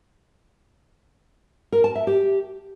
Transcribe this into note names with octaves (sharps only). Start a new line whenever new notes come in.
A#4
A5
E5
G4